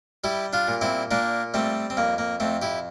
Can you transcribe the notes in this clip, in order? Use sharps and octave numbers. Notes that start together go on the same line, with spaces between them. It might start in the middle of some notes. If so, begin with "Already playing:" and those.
G3 E4 G4
D4 F4
A#2
C4 E4
A#2 A#3 D4
G3 A3 C4
C4
F2 A#3
A#3
F2 A3 C4
E4 G4